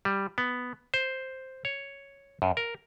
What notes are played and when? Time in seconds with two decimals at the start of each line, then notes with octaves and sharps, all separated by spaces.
0.05 G3
0.38 B3
0.94 C5
1.65 C#5
2.42 F#2
2.57 A#4